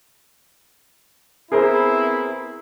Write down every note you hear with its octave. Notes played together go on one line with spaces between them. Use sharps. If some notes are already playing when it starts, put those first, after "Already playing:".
B3 C4 E4 G#4 A#4 C5